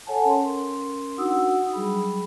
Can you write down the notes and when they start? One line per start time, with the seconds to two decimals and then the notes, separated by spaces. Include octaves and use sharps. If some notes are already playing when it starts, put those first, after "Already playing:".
0.07 A4 C#5 F#5 G#5 A5
0.25 C#4 A#4 C6
1.17 D4 D#4 F#4 F#5 D#6 E6
1.73 F#3 G3 G#4 B5